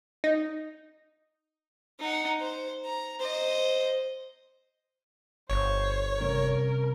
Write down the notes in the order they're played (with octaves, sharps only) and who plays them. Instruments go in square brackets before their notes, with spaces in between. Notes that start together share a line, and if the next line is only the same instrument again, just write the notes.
[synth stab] D#4
[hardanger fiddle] D#4 F#5
C5
A#5
C5 D#5
[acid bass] G1 [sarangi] C5 [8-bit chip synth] C#5
[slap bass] C3 G3 C#4 [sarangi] A#4